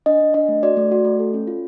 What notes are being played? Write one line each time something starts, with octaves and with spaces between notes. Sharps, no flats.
D4 D#5
D4
D4 D#5
A3
F#4 D5
A3
F#4
A3
A4
C#4
F4